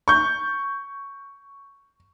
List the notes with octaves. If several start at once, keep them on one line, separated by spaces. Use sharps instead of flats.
C#6 G6